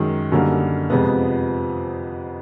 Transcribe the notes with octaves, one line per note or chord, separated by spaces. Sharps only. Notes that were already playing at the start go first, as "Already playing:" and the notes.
Already playing: F#2 D#3 G#3
F#2 D3 G3 A#3 D#4
F2 C3 F3 G#3 B3